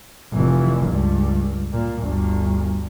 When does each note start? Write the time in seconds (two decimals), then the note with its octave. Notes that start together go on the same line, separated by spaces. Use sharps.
0.33 F1 E3
0.87 C#2 G2
1.72 A#2
2.02 G1 D2